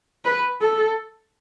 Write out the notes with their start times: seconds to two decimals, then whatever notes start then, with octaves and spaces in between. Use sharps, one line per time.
0.25 B4
0.61 A4